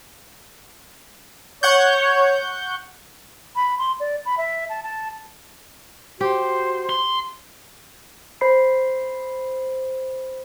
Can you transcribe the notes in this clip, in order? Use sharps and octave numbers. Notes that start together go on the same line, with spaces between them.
C#5 F#5 C#6 G6
B5
C6
D5
B5
E5
A5
A5
F#4 G4 C5
C6
C5 B5 C7